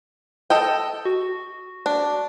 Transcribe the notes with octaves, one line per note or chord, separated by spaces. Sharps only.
A4 D#5 G5
F#4
D4